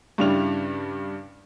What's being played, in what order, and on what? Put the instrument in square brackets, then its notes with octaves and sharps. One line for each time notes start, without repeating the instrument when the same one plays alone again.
[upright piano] G2 C#3 G3 D4 E4 F7